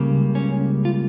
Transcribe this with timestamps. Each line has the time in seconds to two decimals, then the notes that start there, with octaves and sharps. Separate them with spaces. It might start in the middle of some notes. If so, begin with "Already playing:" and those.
Already playing: C#2 C#3 G3 A#3
0.35 C#4
0.85 F4